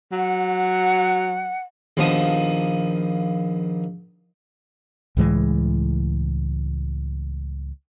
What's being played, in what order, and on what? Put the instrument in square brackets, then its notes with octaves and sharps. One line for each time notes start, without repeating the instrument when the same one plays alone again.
[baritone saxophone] F#3 [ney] F#5
[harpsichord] A#1 D#2 F3 B3 A5 D#6
[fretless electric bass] C#2 A2 E3 G#3